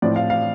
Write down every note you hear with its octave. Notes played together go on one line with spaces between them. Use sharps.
A2 F3 C4 D5
F5
F5